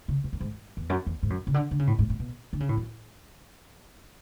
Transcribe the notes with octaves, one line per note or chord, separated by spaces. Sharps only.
C#3
B2
F#2
G#2
E2
F#2
E2
G#2
F#2
C#3
D3
D3
C#3
A2
G#2
A2
B2
D3
C#3
A2
F#2